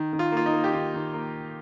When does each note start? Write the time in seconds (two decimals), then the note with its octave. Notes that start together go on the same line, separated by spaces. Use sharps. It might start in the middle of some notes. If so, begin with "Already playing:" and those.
Already playing: D#3
0.13 D#3
0.19 F4
0.32 A#3 F4
0.46 D#4
0.53 A#3
0.64 G4
0.73 D#3 F4
0.94 D#3
1.14 A#3